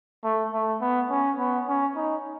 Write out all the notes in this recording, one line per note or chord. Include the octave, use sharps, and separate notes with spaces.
A3
A3
B3
C#4
B3
C#4
D#4